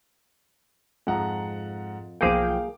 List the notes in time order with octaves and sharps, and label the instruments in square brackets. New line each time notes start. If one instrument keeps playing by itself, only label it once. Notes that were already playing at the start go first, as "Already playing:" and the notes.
[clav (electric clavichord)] F2 [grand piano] G#2 F#5 A#5
[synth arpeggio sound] B1 F3 G5 [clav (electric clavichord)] A#3 G#4 [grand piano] F5 D6